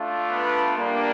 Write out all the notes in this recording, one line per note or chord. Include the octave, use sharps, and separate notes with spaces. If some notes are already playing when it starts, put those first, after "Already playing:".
Already playing: A3 D4 F4
B3 B4
G3 A#3 D4